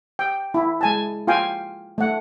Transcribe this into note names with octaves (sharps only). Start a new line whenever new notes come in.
G5
E4
G#3 G#5 A5
F4 F5 G5 G#5
A3 F#5